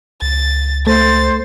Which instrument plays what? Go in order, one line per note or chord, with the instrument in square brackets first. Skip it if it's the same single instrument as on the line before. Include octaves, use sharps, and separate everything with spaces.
[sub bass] C#2 [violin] A6
[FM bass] A3 [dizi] C5 [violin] A6